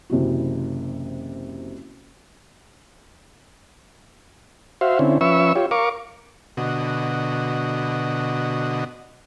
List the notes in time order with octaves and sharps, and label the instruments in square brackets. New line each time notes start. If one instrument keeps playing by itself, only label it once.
[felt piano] F#1 C3 E3 F#4
[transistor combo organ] F#4 C5 E5 F5
D3 C4 C#4 E4
F3 C#4 B4 E5 C#6 E6
F4 G4 C#5
A#4 F5 C#6 D6
B2 D3 F#4 D#5